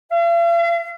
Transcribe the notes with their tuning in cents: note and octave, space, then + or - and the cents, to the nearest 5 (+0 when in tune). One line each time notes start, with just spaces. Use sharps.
F5 -45